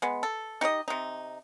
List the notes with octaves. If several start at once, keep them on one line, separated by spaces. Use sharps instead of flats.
G#3 B3
A4
D#4 G4 D5 D#5
C3 D#4